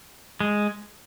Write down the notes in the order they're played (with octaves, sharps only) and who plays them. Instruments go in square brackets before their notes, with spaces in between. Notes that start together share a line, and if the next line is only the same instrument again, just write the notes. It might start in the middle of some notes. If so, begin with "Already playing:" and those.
[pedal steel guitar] G#3